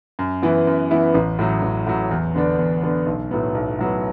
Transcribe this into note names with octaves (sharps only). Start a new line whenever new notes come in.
F#2
E3 B3 E4
F#2
E3 B3 E4
A1
A2 F#3
A1
A2 F#3
E2
D3 B3 D4
E2
D3 B3 D4
B1
A2 F#3 B3
B1
A2 F#3 B3